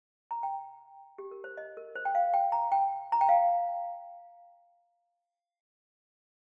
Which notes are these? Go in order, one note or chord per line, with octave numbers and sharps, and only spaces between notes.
A#5
G5
G4
A#4
C5
D#5
A#4
C5
G5
F5
G5
A#5
G5
A#5
G5
F5